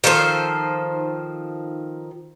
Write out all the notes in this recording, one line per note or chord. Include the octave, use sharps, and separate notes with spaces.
D#3 F3 A4 C5